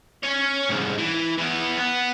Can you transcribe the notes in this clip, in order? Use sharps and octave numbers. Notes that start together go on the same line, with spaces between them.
C#4 C#5
C2 G#2
E3
E3 B3
B3